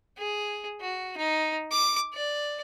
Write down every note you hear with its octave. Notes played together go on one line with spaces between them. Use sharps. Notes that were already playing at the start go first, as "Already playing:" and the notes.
G#4
F#4
D#4
D6
D5